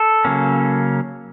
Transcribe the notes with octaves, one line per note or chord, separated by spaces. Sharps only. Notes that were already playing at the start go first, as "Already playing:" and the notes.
Already playing: A4
C#3 F#3 A#3 C#4